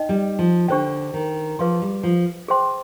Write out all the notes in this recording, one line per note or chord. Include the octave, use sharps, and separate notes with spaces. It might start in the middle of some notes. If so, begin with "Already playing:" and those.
Already playing: D#4 D#5 G5
G3
F3
D3 D4 G4 C5 G5
D#3
F3 G#4 B4 F5 C6
G3
F3
G#4 C5 G5 C6